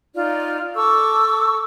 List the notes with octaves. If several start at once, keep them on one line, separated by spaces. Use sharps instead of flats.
D#4 F4 D5
A4 C#6 D6 E6